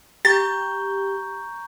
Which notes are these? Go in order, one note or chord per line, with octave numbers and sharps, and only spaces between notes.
G4 A#5 C#6 G6 A6